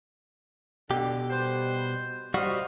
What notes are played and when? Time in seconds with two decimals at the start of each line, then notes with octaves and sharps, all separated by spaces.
0.91 B2 D3 G4
1.30 G3 B4 C5
2.34 G3 F#4 C5 D#5 F5